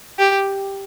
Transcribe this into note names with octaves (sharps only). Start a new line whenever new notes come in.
G4